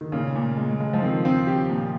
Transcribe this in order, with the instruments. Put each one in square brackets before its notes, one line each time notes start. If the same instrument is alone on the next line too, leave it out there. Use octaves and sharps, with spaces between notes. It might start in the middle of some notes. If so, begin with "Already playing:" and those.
[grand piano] D#3
[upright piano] A#2 [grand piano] C#3
[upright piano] A#2
G#3
G#3
[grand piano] F3
[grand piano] D#3 [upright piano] C4
[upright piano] C4
G4
A#2